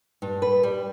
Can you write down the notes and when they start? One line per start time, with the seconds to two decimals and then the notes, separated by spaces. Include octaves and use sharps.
0.22 G2
0.42 B4
0.63 G3